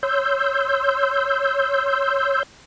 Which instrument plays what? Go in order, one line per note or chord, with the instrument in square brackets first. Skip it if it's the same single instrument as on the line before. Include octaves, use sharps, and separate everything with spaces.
[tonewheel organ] C#5 C6 E6 G6